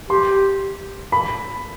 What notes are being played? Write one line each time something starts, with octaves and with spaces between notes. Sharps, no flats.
G4 C6
B5